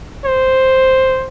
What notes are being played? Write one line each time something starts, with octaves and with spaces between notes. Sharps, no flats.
C5